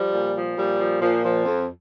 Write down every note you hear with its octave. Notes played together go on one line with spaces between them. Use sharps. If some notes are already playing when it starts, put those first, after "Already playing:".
Already playing: F3 G3
A#2
F3
A#2 G3
F3
A#2 F3
F3
F2